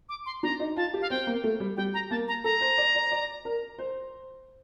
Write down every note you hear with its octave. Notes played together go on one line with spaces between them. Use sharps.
D6
C6
D4 A#5
D#4
F4 A5
G4
F5
C4 G5
A#3
A3
G3
G3 G5
A#5
A#3 A5
A#5
A4 A#5
C5
D5
D5
D5
A#4
C5